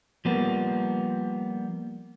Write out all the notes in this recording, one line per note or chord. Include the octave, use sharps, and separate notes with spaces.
F3 G3 A#3 B3